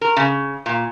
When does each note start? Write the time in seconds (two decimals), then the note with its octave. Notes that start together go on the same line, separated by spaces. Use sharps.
0.01 A#4
0.17 C#3
0.66 A#2